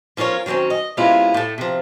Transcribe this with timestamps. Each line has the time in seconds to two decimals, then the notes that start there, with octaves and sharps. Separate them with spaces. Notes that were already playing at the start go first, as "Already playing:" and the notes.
0.17 F3 C#4 F4 A#4 C#5
0.46 D#3 F#3 A3 C4 C#4
0.70 D#5
0.97 C3 G#3 B3 C#4 E4 F4
1.34 A2 A3
1.58 C3 F3